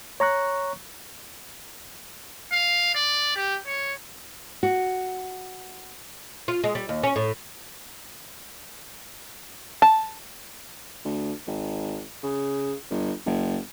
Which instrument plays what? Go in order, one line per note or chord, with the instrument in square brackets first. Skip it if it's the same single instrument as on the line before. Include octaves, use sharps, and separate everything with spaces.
[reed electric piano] C#5 A#5 C#6 F#6
[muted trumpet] F5
D5
G4
C#5
[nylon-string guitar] F#4
[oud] F4
G#3
G3
D#2
C#4
A2
[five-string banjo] A5
[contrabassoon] D2
G#1
C#3
G1
F#1